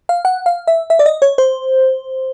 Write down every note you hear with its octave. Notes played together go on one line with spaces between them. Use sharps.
F5
F#5
F5
E5
E5
D5
D#5
C#5
C5